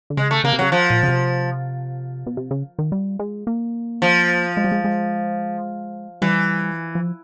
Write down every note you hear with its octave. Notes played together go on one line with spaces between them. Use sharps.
D3
C#3 G#3
A3
C#3 A#3
C3
C#3 F#3
F3
A#2
C#3
C3
B2
C3
C#3
D#3
G3
G#3
A#3
F3
G#3
G3
G#3
G#3
E3 G3
F3